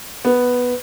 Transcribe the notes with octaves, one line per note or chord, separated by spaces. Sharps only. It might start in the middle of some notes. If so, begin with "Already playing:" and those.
B3